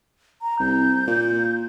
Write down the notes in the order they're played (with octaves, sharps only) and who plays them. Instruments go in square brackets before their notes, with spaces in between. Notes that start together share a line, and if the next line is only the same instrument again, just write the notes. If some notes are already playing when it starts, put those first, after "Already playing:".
[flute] A#5
[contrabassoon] C2 [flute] G6
[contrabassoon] A#2